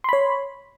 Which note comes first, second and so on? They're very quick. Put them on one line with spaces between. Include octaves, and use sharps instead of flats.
C6 B5 C#5